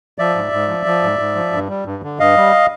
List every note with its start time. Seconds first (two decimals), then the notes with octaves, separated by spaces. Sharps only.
0.18 F3 D5 E5
0.35 G#2
0.52 G#2
0.68 F3
0.86 F3
1.03 G#2
1.19 G#2
1.35 F3
1.52 G2
1.69 G3
1.86 G2
2.03 D3
2.20 G2 D#5 F5
2.36 G3